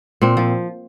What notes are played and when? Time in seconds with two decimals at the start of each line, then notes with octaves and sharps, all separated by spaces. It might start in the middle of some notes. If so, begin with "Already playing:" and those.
0.21 A#2 C4
0.37 F3